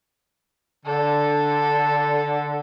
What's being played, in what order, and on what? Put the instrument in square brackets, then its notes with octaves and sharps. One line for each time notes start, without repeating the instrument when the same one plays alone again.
[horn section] D3 [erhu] A4